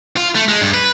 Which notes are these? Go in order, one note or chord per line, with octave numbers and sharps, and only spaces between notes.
F4
A3
G#3
G2
B4